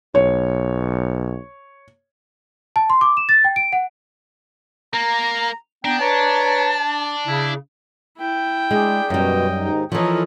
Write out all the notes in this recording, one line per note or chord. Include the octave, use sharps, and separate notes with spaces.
B1 C#5
A5
C6
D6
E7
A6
G5
D7
F#5
A#3 A#5
B3 D4 G5 A#5
B4 C#5 A5 A#5
C#3 E4
E4 G5
G#3 D4 G#4
F#2 B2 F#3 G3 D#5 G5
D#2 G#2 D#4
E3 F3 A4 A#4 C#5 D#5